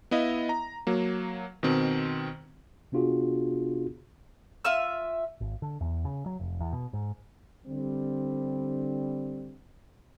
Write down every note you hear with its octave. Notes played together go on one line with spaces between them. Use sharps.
B3 E4 D#5 F5
A#5
F#3 A#3
B2 D#3 C4
C3 B3 D4 F4 F#4 G#4
F4 E5 E6
G#1
D3
E2
C#3
F#3
F1
E2
B2
G#2
D3 G3 C4